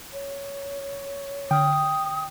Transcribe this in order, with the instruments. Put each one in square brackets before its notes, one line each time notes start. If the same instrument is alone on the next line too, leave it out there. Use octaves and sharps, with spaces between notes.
[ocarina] C#5
[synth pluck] D3 F6 [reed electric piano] G5 [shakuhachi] D#6